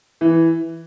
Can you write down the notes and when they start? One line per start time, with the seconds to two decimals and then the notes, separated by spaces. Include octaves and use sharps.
0.21 E3